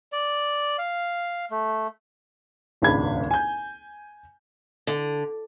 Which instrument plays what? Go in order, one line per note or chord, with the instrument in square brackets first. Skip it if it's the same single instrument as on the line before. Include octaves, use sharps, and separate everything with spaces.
[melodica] D5
F5
A3
[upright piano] D#1 G#1 C#2 D4 B5 G#6
G#5 G6
[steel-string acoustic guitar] D3